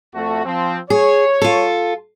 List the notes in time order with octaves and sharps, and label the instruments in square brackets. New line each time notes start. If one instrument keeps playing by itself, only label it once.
[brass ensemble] F2 A3 F#4
F3 C4
[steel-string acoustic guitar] G#4 [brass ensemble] C#5
[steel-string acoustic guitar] F4 A4